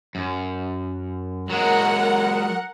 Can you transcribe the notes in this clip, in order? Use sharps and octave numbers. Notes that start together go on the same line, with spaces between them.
F#2
F#3 G#3 A#4 F#5